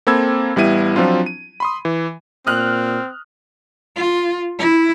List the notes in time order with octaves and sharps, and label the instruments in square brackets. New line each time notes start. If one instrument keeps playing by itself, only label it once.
[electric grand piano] A#3 C4 A4 B5 E6 G#6
A1 G3 B3 E4 D#7
F3 F#3 C4 D4 F4
D#7
B5 C6 D#6
E3
[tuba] A#2 [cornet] C4 [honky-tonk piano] D#6 F6 F#6
[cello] F4
E4